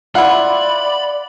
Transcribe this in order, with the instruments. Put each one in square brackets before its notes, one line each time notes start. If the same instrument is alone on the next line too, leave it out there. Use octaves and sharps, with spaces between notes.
[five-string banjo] E4 F4 [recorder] D5 [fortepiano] F#5 [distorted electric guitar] B5